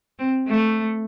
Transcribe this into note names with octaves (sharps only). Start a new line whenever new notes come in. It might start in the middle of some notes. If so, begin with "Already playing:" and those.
C4
A3